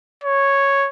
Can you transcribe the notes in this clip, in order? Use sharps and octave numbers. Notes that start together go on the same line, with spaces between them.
C#5